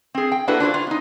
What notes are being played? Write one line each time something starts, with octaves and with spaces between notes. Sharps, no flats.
C4 G#4
G5
A#3 D4 E4 F#4 A4 B4
D4 F4 F#4 C5
F4
B3 D#4